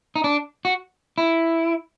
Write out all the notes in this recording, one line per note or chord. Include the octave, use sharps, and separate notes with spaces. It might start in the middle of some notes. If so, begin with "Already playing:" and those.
D#4
D4
F#4
E4